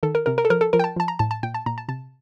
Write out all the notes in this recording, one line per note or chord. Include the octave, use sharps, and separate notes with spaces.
D#3 A4
A#4
C3 A#4
A#4
A4
F3 A#4
A4
F3 A#4
G5
A5
F3 A5
A#5
A2 A5
A5
A#2 G5
A5
A#2 A#5
A5
C3 A5